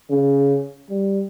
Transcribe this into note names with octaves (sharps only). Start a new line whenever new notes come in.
C#3
G3